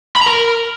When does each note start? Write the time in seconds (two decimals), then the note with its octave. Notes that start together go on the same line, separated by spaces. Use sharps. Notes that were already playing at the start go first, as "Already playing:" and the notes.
0.16 B5
0.21 A#5
0.26 A#4